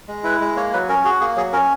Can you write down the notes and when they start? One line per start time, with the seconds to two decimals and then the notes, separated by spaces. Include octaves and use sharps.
0.08 G#3
0.24 E4 B4
0.41 G#3
0.56 A#3 C#5
0.73 F#3 B4
0.89 C#4 A#4
1.05 F#4 G#4
1.21 A#3 G#4
1.36 F#3 G#4
1.53 C#4 A#4